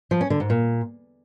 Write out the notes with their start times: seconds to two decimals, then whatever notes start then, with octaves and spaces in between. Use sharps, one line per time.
0.11 F3
0.21 C#4
0.30 D3
0.40 G#2
0.50 A#2